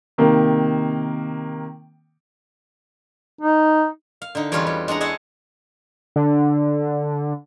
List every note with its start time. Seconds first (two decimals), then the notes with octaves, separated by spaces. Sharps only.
0.18 C3 D#3 A#3
3.41 D#4
4.22 F5
4.35 D3 D#4
4.52 E2 G3 C#4 F4 B4 C#5
4.67 G3
4.88 G#3 D4 F#5 A#5
5.01 G#4 C#5 D#5 E5 F#5 A5
6.16 D3